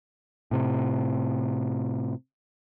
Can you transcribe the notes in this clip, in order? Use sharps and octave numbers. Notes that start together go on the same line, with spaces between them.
A2 C3